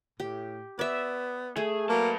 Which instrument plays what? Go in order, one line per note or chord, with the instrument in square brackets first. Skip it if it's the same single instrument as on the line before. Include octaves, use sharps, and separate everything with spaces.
[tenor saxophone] A2 [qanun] G4
[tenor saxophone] B3 [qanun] D5 E5
[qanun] A3 [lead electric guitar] G#4
[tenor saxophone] F#3 [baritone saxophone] A#3 [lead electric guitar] B4 A5